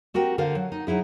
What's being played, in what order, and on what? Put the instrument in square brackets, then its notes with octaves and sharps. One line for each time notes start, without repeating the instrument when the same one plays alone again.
[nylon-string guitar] C4 F#4 G4 A#4 G5
D3 A#4 C5 F5
F#3
D#4
F#3 D#4 E4 G#4